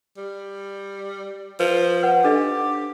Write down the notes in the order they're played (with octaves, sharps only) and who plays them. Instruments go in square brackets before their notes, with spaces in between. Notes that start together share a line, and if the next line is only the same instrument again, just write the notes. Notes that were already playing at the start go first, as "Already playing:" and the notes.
[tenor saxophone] G3
[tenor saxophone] F3 [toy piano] B4
[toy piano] B4 F#5
[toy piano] D4 A4 D#5 [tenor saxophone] G4